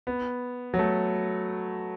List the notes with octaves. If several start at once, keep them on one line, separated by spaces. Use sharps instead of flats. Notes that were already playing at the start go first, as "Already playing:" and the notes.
B3
F#3
A3